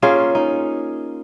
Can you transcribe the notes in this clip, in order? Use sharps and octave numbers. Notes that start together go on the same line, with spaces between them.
A#3 C#4 F4 G#4
D#4